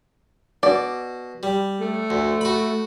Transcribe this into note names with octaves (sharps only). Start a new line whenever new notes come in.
B2 D5
G3
A3
D2
F#4 B5